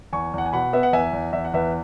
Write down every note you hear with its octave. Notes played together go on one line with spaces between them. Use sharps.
E2 G#5 C#6
E2 F#5
G#5
B2 F#5 B5
B3 E5
F#5
E2 E5 G#5
E2
E2 E5
F#5
E2 B4 E5